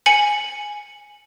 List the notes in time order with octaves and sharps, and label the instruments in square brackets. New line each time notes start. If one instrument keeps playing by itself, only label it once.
[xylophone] G#5 C#7 F#7